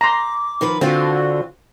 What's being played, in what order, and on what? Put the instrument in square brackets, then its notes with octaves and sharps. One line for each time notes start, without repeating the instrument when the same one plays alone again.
[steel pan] A#5 C6 [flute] D6
[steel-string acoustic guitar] D#3 F3 B4
[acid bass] D3 [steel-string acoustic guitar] C4 F4 [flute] F#4